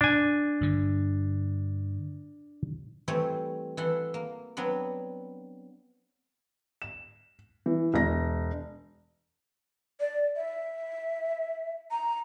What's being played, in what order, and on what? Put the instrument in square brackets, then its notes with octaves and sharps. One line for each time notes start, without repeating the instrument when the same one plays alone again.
[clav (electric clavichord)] D4 G#5
[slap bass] G2 D3
[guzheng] E3 G3 A3 C4 C5 C#5
E3 A4 F#5 C6
A#3
F#3 B3 C4 D4
[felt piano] E7
E3
E1 A#6
[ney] D5
E5
A#5